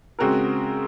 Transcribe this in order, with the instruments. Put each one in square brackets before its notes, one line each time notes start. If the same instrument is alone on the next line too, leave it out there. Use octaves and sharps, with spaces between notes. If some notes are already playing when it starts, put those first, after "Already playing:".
[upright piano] C#3 G#3 C4 F#4 A#4